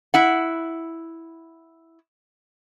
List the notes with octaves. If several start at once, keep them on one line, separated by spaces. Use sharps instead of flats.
E4 F#5